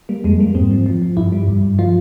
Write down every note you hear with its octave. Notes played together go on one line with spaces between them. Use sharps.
G3 A#3
F2 G#3
G3 A#3
G#2 C4
F3
F3
F3
G2 E4
G3
G2
G2
F3 F4